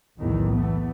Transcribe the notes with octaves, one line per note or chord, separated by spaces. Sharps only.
B1 E2 A2 D#3 E3
E2 A3 B3